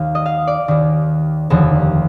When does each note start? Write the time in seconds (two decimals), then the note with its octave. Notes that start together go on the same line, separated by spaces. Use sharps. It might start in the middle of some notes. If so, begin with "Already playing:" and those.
Already playing: D#2 D#3 F5 G5
0.15 D#5
0.26 F5
0.47 D5
0.68 D#2 D#3
1.50 F1 D#2 D3 F3